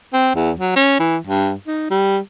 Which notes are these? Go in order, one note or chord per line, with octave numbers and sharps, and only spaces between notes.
C4
E2
F#3
C#4
E3
G2
D#4
G3